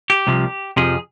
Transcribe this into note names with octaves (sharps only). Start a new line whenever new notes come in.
G4
C2 C3 F3
F2 C3 F3 G#4